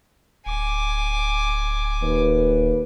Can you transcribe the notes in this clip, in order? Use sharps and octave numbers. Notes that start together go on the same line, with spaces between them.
D1 G#5 D6
D#2 B4